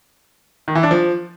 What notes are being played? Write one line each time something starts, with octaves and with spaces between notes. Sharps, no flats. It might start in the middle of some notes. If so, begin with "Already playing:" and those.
D#3
E3
D4
F3